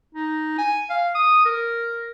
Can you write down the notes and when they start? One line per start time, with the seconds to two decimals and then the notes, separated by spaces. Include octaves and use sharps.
0.15 D#4
0.58 G#5
0.90 F5
1.15 D#6
1.46 A#4